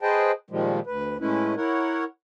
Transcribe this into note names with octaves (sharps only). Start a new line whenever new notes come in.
G#4 B4 C5 D#5 G5 A5
A#2 D#3 F3 G3 G#3
D2 B4
A2 G#3 A3 C#4 E4 B4
E4 A#4 C#5 F#5